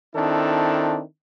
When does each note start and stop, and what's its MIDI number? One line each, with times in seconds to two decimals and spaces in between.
0.14 1.01 51
0.14 1.01 60
0.14 1.01 62
0.14 1.01 64
0.14 1.01 69